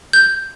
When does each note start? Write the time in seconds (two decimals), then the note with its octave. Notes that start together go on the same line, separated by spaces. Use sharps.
0.13 G6